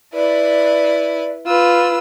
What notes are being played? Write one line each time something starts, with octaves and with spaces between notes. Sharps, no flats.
E4 B4 D5
F4 B4 E6